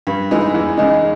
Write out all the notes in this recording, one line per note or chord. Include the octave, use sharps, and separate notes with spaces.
G2
E3 G#3 D#4
E2
C#3 G#3 D#4